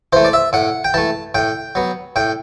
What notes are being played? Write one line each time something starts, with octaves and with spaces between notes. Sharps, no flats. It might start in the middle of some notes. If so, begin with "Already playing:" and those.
E3 A3 C5
D5
E5
A2 F#5
G5
E3 A3 A5
A2 G5
F#3 B3
A2 G5